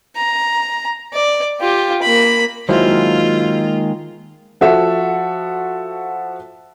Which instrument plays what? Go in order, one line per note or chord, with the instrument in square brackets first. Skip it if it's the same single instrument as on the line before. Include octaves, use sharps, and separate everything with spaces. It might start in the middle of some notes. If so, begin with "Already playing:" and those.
[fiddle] A#5
D5
F4 G4
A#3 B5
[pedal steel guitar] D#3 G#3 A#3 [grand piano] F#3 E4 C5 [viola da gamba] F4
[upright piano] F3 F#4 A4 E5